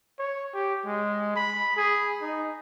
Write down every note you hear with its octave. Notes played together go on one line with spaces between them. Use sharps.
C#5
G4
G#3
B5
G#4
D#4